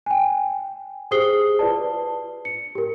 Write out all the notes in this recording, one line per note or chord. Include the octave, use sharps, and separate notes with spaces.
G5 G#5
G4 G#4 C5 D#6 C7 G7
F4 B4 D5 A5
C#7
G4 A#4